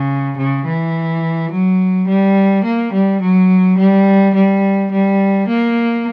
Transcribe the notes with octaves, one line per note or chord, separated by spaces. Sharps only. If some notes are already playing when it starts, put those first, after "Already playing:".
Already playing: C#3
C#3
E3
F#3
G3
A#3
G3
F#3
G3
G3
G3
A#3